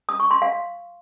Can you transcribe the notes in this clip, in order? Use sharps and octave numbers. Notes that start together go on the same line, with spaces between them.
D#6
C#6
C6
F5